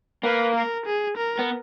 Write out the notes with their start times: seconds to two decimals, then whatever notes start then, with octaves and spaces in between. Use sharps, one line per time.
0.23 A#3 B4
0.55 A#4
0.86 G#4
1.17 A#4
1.39 B3